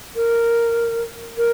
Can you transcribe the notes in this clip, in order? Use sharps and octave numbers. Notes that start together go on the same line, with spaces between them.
A#4
A#4